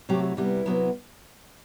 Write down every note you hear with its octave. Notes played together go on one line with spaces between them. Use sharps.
C3 F#3 A3 G4
E4
C3 G3 B3 E4
C3 F#3 B3